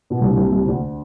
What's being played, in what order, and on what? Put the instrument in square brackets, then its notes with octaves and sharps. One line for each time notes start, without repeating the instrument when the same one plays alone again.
[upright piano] B2
C2 C3
D3
C2 C3
C2 C3
C3
D2 D3